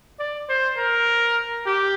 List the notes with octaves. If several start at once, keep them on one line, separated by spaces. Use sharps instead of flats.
D5
C5
A#4
G4